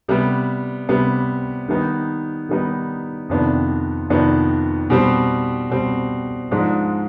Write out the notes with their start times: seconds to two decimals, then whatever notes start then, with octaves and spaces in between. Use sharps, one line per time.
0.08 C3 G3 B3
0.89 C3 G3 B3
1.68 D#3 G3 B3 D#4
2.49 D#3 G3 B3 D#4
3.29 F2 C3 D#3 B3 D4
4.10 F2 C3 D#3 B3 D4
4.90 B2 G3 C4
5.70 B2 G3 C4
6.51 G#2 F3 G#3 D4